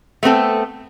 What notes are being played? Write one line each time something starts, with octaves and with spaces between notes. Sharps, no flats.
A3 B3 C4 A4